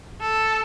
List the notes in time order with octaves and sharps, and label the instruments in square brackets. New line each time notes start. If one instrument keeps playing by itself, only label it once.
[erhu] A4